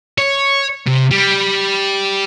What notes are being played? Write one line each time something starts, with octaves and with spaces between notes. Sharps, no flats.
C#5
C3
G3